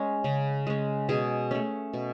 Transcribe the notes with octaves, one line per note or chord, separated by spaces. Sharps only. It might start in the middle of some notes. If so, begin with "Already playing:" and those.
Already playing: G#3 C#4
C#3
G#3 C#4
B2 G#4
A3 C#4
B2